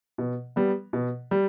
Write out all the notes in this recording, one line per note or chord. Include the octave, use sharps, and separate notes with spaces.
B2
G3 B3
B2
G3